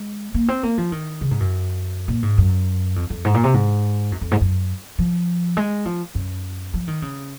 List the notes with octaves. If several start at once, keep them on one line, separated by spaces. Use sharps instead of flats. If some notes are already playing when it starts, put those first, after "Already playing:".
Already playing: G#3
A#3
C4
A#3
F3
D#3
C#3
G#2
F#2
A#2
G#2
F#2
F2
F2
G#2
A#2
C3
G#2
F#2
F2
G#2
F#2
F3
G#3
F3
F#2
F3
D#3
C#3